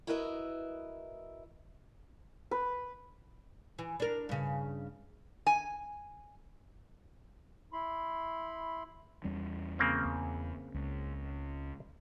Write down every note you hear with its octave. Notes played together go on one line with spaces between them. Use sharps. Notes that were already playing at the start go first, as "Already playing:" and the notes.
E4 F#4 A#4 B4 D#5 E5
B4
E3
D4 A#4
G2 C#3
G#5
E4 B5 C6
E2 G3 C#4
C#3 A#3 C4
E2
C#2